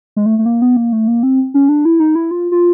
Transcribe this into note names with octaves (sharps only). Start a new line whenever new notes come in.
G#3
A3
A3
A#3
B3
A#3
A3
A#3
C4
C#4
D4
E4
D#4
E4
F4
F4